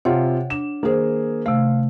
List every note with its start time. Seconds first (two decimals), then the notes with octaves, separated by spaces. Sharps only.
0.05 C3 F4 C#5 F#5
0.50 D4 E7
0.83 D#3 A#3 G#4 C5
1.46 C3 A3 F5